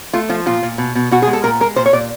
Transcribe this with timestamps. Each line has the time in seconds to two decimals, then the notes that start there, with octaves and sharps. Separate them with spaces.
0.13 A3 F4
0.29 F3 F4
0.46 A#2 F4
0.63 A#2
0.78 B2
0.95 B2
1.11 B2 F#4
1.22 G#4
1.28 G#3
1.33 A4
1.44 A#2 A#4
1.61 G#3 A#4
1.76 A#2 C5
1.86 C#5
1.93 A#2 D5